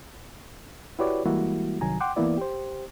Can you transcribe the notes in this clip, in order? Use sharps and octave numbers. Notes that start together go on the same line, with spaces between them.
E4 F#4 G4 B4 C#5 D5
E3 G3 G#3 A#3 E4 F#4
C2 D#3 F#3 G#5 A#5
F#5 G5 C6 D6
E3 A#3 B3 E4 D5
G4 C5